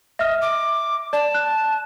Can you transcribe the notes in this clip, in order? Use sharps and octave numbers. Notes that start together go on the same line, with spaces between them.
D#5 E5 F6
D6
D5 A5
F#6